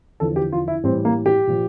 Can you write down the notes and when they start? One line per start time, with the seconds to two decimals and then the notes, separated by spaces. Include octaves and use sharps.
0.20 E2 D3 F3 A4
0.36 G4
0.52 F4
0.68 E4
0.83 A2 E3 G3 C4
1.05 A#3
1.26 G4
1.47 A#2 F3